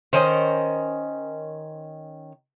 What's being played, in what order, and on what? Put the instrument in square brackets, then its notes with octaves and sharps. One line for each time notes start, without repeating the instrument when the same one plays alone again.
[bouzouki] D#3 C#4 D#5 [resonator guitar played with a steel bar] C5